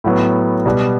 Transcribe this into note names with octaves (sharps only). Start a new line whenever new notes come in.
A2 F#3 B3
B2 G3 B3